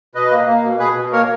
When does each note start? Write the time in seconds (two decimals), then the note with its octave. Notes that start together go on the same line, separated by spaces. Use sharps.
0.15 B2 B4 D#5
0.31 A#3
0.47 A#3
0.64 B2
0.79 B2 G#4 B4
0.96 B2
1.12 A#3 A#4 C#5